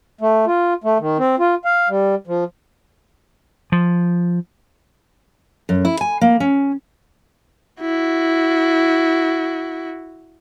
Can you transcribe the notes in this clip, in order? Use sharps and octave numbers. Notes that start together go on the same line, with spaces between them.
A3
F4
A3
D#3
C4
F4
F5
G3
F3
F3
F#2
E4
G#5
A#3
C#4
E4 F#4